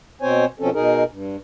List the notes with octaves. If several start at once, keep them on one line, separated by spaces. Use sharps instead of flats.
B2 C4 C5 C#5 G#5
B2 F3 C4 C#4 A4
B2 D#4 G#4 A#4
G2